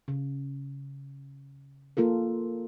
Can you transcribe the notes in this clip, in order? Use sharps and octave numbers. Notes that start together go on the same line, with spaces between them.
C#3
A#3 F4 A4 A#4